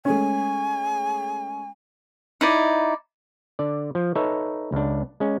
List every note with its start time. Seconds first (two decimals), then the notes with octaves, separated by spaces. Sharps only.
0.05 G#3 A3 C#4 G#5
2.41 D#4 E4 D5
3.59 D3 D5
3.95 F3
4.15 D#4 A4 B4 C#5 E5
4.72 C#2 D4
5.20 G#3 C#4